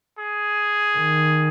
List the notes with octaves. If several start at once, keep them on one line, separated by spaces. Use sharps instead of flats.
G#4
D#3